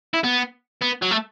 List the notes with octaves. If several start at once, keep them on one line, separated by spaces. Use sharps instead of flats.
E4
B3
B3
F#3
A3